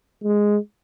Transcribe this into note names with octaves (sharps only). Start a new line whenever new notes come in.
G#3